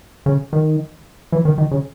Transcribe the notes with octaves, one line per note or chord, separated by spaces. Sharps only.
C#3
D#3
E3
D#3
D#3
C#3